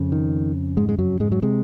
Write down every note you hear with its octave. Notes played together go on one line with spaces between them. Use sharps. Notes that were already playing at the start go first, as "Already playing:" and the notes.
Already playing: F2 C#3
D#3
G#2 G#3
G#3
F#2 F#3
G#2 G#3
F#3
C3 G#3